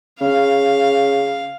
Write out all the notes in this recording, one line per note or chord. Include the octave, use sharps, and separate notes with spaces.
C#3 F5